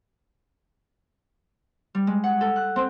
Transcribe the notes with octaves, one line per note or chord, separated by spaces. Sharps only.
G3
G#3
F#5
A4
F#6
C4